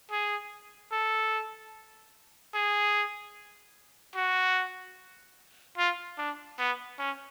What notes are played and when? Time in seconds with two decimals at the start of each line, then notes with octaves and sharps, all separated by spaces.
0.11 G#4
0.92 A4
2.54 G#4
4.15 F#4
5.77 F4
6.18 D4
6.59 B3
6.98 C#4